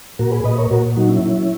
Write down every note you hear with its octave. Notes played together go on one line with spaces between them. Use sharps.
A#2 F#4 A#4
G#4 B4
A#2 B4 D#5
A#4 C#5
A#2 F#4 A#4
F#3 D#4 F#4
C#4 E4
F#3